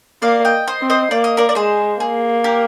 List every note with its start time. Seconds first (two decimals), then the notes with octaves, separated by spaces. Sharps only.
0.22 A#3 D5 F5
0.45 D#5 G5
0.67 C5 D#5
0.82 C4
0.90 C5 D#5
1.11 A#3 D5
1.24 D#5
1.37 A#4 D5
1.49 D5
1.55 G#3 G#4 C5
2.00 A#3 G#4
2.44 G4 A#4